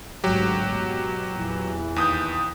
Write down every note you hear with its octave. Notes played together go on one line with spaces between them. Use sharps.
G#1 D2 F#3 G4
B2
E2 A#2 E3
D#2 D#6 G6